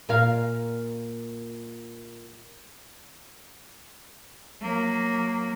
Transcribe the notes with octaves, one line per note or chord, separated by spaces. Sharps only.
A#2 A#4 F5
F#3 A#3